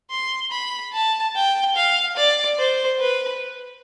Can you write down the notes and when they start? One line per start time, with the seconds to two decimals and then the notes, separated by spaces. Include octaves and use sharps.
0.11 C6
0.52 B5
0.93 A5
1.35 G5
1.76 F5
2.17 D5
2.58 C5
2.99 B4